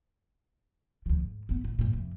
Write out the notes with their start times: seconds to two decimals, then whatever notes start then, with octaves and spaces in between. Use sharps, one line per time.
1.06 D2 F3
1.21 G#2
1.49 G#1 B3
1.64 A2
1.79 G2 A#2
1.93 F2 C3